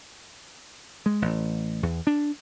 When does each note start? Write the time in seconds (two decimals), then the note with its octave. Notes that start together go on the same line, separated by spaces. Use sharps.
1.06 G#3
1.22 A1
1.83 E2
2.07 D4